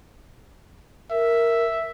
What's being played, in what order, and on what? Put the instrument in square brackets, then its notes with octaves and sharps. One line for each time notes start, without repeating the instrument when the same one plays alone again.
[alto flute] A#4 [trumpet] E5